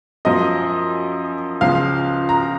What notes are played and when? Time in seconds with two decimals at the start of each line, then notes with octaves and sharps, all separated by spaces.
0.25 F#2 F3 D#5
1.61 C#2 C#3 F3 F5
2.29 A#5